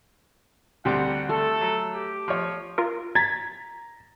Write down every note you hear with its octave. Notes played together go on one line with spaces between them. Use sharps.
D2 G3 C4 G4 F#5 A#5
A3 A4
F#3
G4
F3 C#5
F4 A#4
A#5 G#6 A6 B6